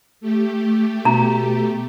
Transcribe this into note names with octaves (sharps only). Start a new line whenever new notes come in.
A3 G4
B2 A#5